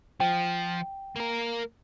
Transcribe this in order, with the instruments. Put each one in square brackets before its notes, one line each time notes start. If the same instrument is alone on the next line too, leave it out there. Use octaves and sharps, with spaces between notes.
[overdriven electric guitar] F3 [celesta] G5
[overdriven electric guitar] A#3 A#4